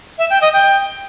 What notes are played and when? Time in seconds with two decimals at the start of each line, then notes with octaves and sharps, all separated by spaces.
0.18 E5
0.30 G5
0.42 D#5
0.53 G5